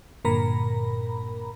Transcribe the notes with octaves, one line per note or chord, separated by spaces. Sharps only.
G2 A#2 D3 A#4 A#5 B5